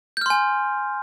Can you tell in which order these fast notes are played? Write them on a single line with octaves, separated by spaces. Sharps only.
G6 F6 C6 G#5